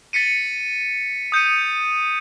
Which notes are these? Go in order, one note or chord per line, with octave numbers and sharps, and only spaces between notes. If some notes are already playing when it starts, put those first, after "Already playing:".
A6 B6 C#7 D#7
D#6 G6 C#7 D#7